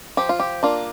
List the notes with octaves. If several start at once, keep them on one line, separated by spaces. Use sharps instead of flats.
F3 G4
F4
G4
A#3 D4 F4